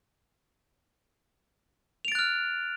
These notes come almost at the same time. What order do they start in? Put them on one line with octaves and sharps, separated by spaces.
F7 D7 A6 F#6 F6